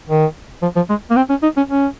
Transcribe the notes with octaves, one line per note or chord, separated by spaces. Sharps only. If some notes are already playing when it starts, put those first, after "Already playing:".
D#3
F3
F3
G#3
A#3
C4
C#4
D#4
C#4
C#4